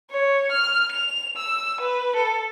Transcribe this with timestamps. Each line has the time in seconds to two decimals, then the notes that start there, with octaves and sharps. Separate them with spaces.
0.10 C#5
0.52 F6
0.93 F7
1.37 E6
1.81 B4
2.16 A4